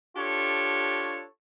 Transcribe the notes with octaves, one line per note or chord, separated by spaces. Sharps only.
D4 F4 G4 A4 C#5